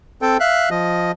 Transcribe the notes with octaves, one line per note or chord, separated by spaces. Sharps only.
C4 A4 G5
E5 F5 F#6
F3 D#5